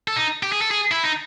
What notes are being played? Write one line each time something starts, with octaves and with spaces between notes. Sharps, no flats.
A4
D#4
G4
G#4
A4
G#4
E4
D#4